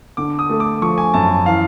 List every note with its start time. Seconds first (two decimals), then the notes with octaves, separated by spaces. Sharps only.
0.17 D3 D6
0.39 D#6
0.49 A3
0.60 D6
0.81 F3 C#6
0.98 G#5
1.14 F#2 A5
1.46 E3 F5